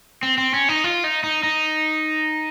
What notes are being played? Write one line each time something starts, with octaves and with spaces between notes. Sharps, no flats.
C4
C4
C#4
D#4
F4
D#4
D#4
D#4